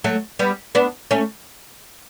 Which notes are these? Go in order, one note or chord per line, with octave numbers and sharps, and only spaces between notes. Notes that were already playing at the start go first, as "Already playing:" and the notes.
F#3 A3
G3 B3
B3 D4
A3 C#4